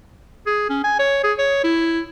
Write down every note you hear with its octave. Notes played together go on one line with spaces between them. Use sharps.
G#4
C#4
G#5
C#5
G#4
C#5
E4